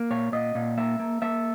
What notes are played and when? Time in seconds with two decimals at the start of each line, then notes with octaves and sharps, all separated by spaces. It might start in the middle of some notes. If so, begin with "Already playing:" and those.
Already playing: A#3
0.11 A#2 C#5
0.32 A#2 D#5
0.55 A#2
0.77 A#3 E5
1.00 A#3
1.22 A#3 E5